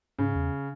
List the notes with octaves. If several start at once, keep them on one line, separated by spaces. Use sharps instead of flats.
G#2 C#3
E2